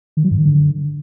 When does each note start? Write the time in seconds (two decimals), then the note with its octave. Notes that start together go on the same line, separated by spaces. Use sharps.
0.17 D#3
0.24 F#3
0.31 G2
0.38 D#3
0.45 D3